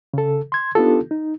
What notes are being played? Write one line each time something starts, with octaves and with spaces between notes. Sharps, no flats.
C#3 A4
C6 G#6
B3 D4 D#4 F4 G4 A4
D#4